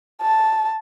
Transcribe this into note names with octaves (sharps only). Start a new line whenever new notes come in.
A5